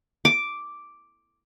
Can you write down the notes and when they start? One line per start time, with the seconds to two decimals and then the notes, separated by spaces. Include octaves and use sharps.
0.25 D6